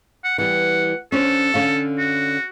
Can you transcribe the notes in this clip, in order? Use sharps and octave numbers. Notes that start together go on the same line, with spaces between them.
F#5
E3 G3 F#5
C#4 D4 A4 C5
D3 C#4 F5
F#4